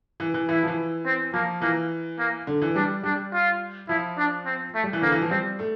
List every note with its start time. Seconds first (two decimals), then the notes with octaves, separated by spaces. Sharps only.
0.20 E3
0.34 E3
0.48 E3 E4
0.63 F3
0.68 E3
1.05 C4
1.34 F3 A#3
1.62 E3 A#3
2.19 A#3
2.47 D3
2.62 E3
2.75 G3 D4
3.03 G3 D4
3.33 F4
3.89 F3 E4
4.18 D4
4.46 C4
4.75 A3
4.84 G3
4.93 E3
5.02 D3 A#3
5.12 E3
5.21 F3
5.31 G3 C4
5.59 A3